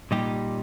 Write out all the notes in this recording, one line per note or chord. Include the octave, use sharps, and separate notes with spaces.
A#2 G3 D#4 G4